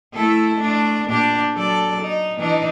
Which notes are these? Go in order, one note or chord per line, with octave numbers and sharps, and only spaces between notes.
A3 E4 A4
A3 D4
A#2 D4 G4
F#3 A4 D5
D#4
E3 D4 D#4